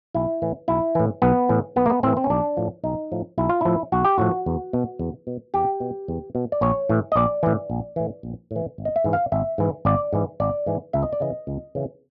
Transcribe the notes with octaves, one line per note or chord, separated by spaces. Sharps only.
B1 E4
A2 E3
B1 E4
A2 E3
B1 B3
A2 E3
B1 B3
A#3
B3
A2 E3 C4
C4
C#4
B1 D4
A2 F3
B1 D#4
A2 F3
B1 E4
F4
A2 F3 E4
B1 F#4
G4
A2 F3 F#4
E2
B2
E2
B2
E2 G4
B2
E2
B2
D5
A#1 C#5
A2 E3
D#5
A#1 D5
A2 E3
A#1
A2 E3
A#1
A2
E3
G#1
D#5
E5
G#2 E3
F5
G#1 E5
G#2 E3
G#1 D5
G#2 E3
G#1 D5
G#2 E3
C#2 E5
D#5
D5
C#3 E3 D#5
C#2
C#3 E3